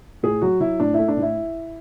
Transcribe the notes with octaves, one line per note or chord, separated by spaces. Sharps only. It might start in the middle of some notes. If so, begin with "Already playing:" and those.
A2 G#4
F#3 F#4
F#3 E4
A2 D4
A3 E4
D4
A2
E4